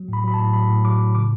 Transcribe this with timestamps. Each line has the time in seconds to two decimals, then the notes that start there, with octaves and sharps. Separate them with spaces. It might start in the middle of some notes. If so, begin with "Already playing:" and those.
Already playing: F#3
0.08 A2 B5
0.24 F#3 B5
0.34 A5
0.39 A2
0.54 F#3 B5
0.69 A2
0.85 F#3 D6
1.00 A2
1.15 C#3 D6